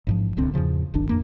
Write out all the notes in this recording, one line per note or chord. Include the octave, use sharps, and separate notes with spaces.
A1 G#2 F3
D1 C2 D3 C4
E2 G#2 C#3 F3
D1 G1 D#3 D4
A1 F2 A#3